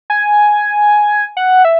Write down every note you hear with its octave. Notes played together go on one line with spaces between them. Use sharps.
G#5
F#5
E5